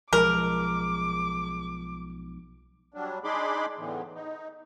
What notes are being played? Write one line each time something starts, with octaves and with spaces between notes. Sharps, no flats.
B1 F3 G#3 A#4 D6
F#3 G3 D4
D4 D#4 G#4 B5 C6 D6
E2 A2 D3 E3
D#4